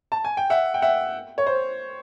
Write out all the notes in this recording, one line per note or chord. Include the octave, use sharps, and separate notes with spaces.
A5
G#5
G5
E5 F#5
G5
E5 F#5
C#5
C5